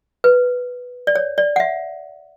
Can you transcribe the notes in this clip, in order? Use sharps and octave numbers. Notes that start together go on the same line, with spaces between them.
B4
D5
C#5
D5
F#5
E5